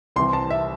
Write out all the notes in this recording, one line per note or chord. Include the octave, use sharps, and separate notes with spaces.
C2 C3 E3 C6
A5
E5